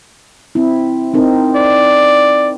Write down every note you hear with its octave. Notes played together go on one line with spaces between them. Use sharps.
C4 E4
C4 D#4 A#4
D5